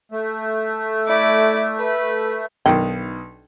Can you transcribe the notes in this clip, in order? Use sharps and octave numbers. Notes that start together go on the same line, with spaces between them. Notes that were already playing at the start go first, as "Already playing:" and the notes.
A3
E4 D5
B4
B1 D#3 D4 D#4 G5